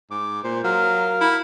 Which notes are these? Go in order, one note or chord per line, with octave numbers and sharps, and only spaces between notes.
G#2 D6
A#2 C5
F#3 A#4 F5
E4